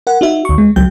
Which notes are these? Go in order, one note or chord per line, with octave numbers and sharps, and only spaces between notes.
A#4 F#5
D#4 F#4 E5
D2 C#6
G#3
C#2 F#3 G5 G6